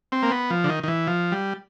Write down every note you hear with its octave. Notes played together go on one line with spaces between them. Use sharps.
C4
A#3
B3
F3
D3
D#3
D#3
E3
F3
G3